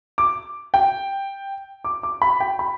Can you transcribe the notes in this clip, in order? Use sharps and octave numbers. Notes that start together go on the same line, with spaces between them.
D6
G5
D6
D6
B5
G5
B5